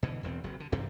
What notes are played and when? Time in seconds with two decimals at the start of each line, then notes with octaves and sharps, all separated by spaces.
0.03 B2 D3 E3
0.23 E1 E2 F#3 C4
0.44 F#1 F#3
0.60 D3
0.72 G2 C3 E3 C4